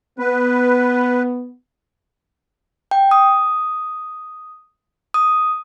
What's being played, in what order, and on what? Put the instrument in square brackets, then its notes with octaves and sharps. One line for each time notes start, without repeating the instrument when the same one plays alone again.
[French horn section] B3 [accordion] B4
[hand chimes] G5
D#6
D#6